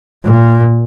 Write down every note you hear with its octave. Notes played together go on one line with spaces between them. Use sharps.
A#2